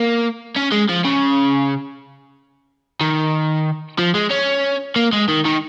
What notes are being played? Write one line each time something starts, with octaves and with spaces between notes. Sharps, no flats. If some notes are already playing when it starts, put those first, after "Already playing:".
Already playing: A#3
C#4
G#3
F3
C#3
D#3
F3
G#3
C#4
A#3
G#3
D#3
D#3